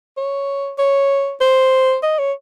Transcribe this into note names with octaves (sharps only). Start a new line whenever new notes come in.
C#5
C#5
C5
D#5
C#5